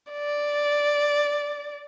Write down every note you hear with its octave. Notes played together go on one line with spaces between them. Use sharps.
D5